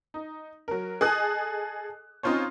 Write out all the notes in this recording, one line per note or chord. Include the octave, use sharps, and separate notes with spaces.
D#4
F#3 A#4
G#4 A4 D#5 G#5 D#6 F#6
C4 C#4 D#4 F4 C5 C#5